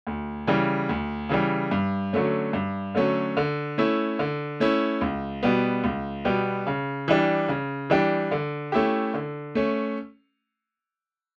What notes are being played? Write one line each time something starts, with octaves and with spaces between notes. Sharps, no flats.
D2
C#3 E3 G3
D2
C#3 E3 G3
G2
D3 F#3 A3 C#4
G2
D3 F#3 A3 C#4
D3
A3 C#4 E4
D3
A3 C#4 E4
C#2
B2 G3 B3
C#2
B2 G3 B3
C#3
E3 G3 D4 G4
C#3
E3 G3 D4 G4
D3
A3 C#4 E4 G4
D3
A3 C#4